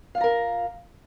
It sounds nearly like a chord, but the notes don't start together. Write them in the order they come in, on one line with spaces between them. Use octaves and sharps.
F5 F4 A#5 A#4